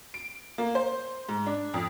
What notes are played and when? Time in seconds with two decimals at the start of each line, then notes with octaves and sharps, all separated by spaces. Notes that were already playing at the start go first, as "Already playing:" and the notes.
0.14 D7
0.58 A#3
0.75 C5
1.29 G#2
1.46 D4
1.74 F2